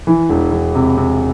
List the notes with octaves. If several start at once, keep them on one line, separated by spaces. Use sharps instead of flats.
E3
E1
E1
C3
C3